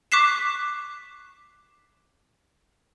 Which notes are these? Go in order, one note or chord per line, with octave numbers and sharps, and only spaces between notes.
C#6 D6 F#6 B6 C7 E7